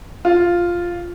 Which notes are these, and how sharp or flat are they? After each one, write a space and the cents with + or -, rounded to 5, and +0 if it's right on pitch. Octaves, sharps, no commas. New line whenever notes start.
F4 +0